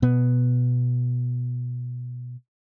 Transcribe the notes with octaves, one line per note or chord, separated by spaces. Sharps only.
B2 B3